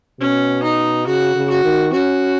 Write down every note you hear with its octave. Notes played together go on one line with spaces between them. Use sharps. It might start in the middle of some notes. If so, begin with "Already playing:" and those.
B2 C#4
D#4
C#3 F#4
C#3
F#4
D#3
C#4 F#4